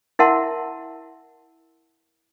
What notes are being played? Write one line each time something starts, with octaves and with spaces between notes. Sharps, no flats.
E4 A#4 E5 F#5 A5 C6